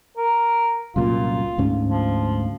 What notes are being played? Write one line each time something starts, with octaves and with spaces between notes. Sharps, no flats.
A#4
C2 F#2 A#2 F4
D2 G#2 C#4
F3